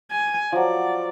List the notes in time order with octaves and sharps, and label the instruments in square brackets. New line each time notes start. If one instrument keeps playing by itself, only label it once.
[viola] G#5
[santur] F3 F#3 [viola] D5